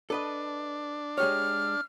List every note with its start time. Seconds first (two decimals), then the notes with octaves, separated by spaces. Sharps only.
0.10 D4 A4 B4 D#5
1.18 G#3 G4 C#5 F6